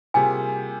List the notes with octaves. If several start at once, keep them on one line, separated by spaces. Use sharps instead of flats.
C3 G3 A#3 F4 G#4 G#5